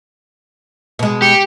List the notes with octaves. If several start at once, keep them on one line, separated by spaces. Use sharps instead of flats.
B2 G#3
G4 C#7